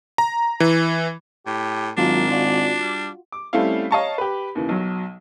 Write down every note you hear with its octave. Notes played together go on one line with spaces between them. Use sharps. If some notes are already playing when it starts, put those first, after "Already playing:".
A#5
E3
A2 G4
G#1 F#3 D4 F4 A#4
F4 F#4 D5
G3
D6
G3 A3 C4 C#4 E4 F5
C#5 D#5 F5 A5 A#5 C#6
G4 B4
D#2 C#3 E3
B1 F#3